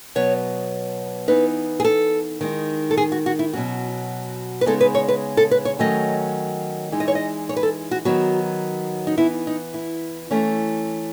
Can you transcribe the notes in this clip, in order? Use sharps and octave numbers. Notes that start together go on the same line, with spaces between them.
B2 F#3 B3 C#5
E3 B3 D#4 B4
G#4
A4
D#3 G#3 D#4
A4
G#4
F#4
F#4
E4
B2 F#3 C#4 F#4
B4
C#3 G#3 B3 D#4 A4
B4
C#5
B4
A4
B4
C#5
D#3 F#3 A3 C#4 D#5
E3 G#3 D#4
D#5
C#5
D#5
C#5
B4
A4
F#4
D#3 F#3 B3 F#4
D#4
E3 B3 D#4 E4
D#4
E4
E3 A3 C#4